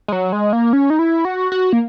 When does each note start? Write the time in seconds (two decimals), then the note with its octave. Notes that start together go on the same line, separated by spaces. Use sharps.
0.08 G#3
0.12 F#3
0.32 G#3
0.53 A#3
0.73 C#4
0.90 D#4
0.99 E4
1.25 F#4
1.52 F#4
1.73 A#3